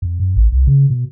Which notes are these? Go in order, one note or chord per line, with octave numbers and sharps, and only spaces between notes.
F2
F#2
A1
C2
C#3
B2